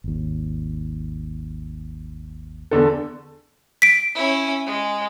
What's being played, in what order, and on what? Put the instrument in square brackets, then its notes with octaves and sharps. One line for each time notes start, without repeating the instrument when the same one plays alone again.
[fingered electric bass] G#1 D#2
[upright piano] E2 D3 A4
[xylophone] B6 D7
[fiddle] C#4 E4
G#3